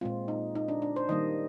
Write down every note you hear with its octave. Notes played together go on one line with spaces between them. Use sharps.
A#2 G#3 C4 F4
D#4
D#4
D4
D4
C5
D#3 G3 A#3 D#5